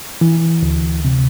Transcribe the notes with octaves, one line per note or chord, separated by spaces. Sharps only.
E3
D2
C3